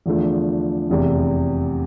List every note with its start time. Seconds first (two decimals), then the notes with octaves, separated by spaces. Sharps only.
0.06 E2 D3 F3 A3 D4
0.89 F1 E2 C3